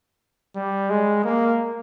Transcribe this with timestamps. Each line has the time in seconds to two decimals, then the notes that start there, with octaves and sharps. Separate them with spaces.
0.56 G3
0.90 G#3
1.25 A#3